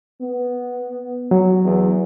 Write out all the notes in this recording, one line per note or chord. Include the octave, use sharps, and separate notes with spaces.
B3
F#3
E2